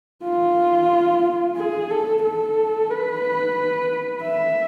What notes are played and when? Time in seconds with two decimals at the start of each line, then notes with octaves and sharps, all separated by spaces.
0.24 F4
1.57 G#4
1.91 A4
2.23 A4
2.90 B4
4.23 E5